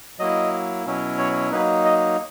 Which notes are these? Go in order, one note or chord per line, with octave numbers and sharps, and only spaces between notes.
F#3 A#3 E4 D#5
B2 F#3 C#4 E4
C#5
F#3 A#3 D#4 B4
D#5